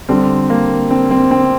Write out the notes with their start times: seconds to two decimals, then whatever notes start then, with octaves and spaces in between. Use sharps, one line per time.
0.09 D3 G3 C4
0.50 A#3
0.91 C4
1.11 C4
1.31 C4